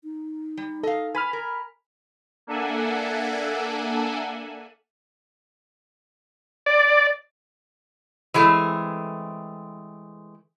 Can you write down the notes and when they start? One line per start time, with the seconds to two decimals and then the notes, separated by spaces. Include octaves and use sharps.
0.04 D#4
0.57 G3
0.83 A4 D#5 F5
1.15 B4 G#5 B5 F6
1.33 A#4
2.47 A#3 D4 A4 E5 F#5 G#5
6.66 D5
8.34 E3 F#3 G#3 A3 C4